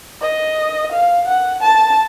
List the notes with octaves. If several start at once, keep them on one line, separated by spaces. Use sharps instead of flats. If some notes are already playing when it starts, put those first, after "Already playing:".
D#5
F5
F#5
A5